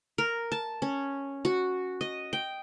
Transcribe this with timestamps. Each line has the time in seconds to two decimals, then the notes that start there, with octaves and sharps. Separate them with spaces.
0.18 A#4
0.52 A5
0.82 C#4
1.45 F#4
2.01 D#5
2.33 G5